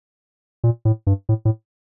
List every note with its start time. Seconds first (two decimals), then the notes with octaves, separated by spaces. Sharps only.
0.64 A#2
0.85 A2
1.07 G2
1.29 A2
1.45 A2